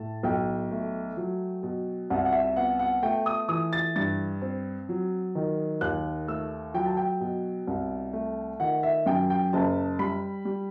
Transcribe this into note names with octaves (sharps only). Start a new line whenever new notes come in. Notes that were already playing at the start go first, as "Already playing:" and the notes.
Already playing: A2 A5
B1 G5
A3
F#3
B2
C2 F#5
F#5
E5
B3 F#5
F#5
A3 G5
D#6
E3 D#6
A6
G2 A6
C4
F#3
D#3
D#2 F#6
A3 E6
F#3 G5
A5
G5
B2
C2
A3
D#3 F#5
E5
F#2 G5
G5
F#1 A5
G3 B5
G3